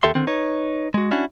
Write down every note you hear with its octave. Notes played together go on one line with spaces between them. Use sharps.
D#2 G4 A4 E5 C6
D3 D#3 C4
D#4 B4 C#5
G#3 F#4
C#4 D4 E4 F#4